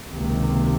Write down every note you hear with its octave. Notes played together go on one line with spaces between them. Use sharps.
C#2 C3 D#3 A#3